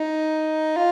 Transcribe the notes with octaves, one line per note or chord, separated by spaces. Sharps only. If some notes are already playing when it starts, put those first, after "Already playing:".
Already playing: D#4
F4